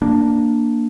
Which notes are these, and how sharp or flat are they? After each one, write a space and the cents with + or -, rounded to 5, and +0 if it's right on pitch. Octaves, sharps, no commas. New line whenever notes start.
A#3 +0 D4 +0